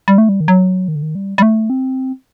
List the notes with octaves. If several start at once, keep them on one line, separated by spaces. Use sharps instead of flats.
G3
A3
G3
D#3
F#3
D#3
D3
D#3
G3
G3
A3
C4